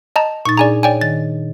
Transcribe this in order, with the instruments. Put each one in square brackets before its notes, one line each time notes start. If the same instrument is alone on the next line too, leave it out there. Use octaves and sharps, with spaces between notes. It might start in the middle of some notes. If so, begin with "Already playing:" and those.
[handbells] D#5 A5 A#5
[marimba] A#2 D#4 [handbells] C#6 A6
[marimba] D4 G#4 [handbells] D5 G#5 A#5
[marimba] C#5 [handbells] D5 G5 G#5
[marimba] D#3 [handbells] A6